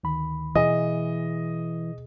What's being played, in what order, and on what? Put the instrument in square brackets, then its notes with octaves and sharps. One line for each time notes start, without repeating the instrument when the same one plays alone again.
[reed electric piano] D2 D#3 B5
[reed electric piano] B2 G#4 D#6 [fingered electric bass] E3 [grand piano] D#5